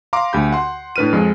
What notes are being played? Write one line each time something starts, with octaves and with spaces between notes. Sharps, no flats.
F5 A#5 C6 D6
D2 G4 B5 G6
F#5 C6
A2 D4 B4 F6 D#7
F2 G#3